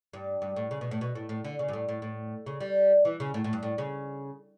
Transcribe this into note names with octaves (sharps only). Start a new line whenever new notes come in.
G2
G2
A2
C#3
B2
A2
B2
A2
A2
D3
C#3
G2
A2
A2
A2
C#3
G3
E3
C#3
A2
A2
G2
A2
C#3